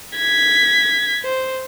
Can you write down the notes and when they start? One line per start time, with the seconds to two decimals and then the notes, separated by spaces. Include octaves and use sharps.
0.17 G#6 B6
1.24 C5